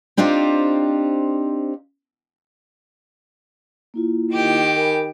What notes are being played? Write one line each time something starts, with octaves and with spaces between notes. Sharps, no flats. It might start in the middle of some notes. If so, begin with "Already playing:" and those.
C4 D4 D#4 F4 G4 C5
A#3 E4 F4
D#3 G4 D6
A#4 G#5 B5